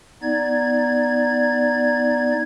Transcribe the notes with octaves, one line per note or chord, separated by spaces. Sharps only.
B3 D#4 D5 G#6